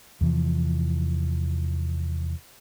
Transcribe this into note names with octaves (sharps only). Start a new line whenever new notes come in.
E2 C3 E3 F3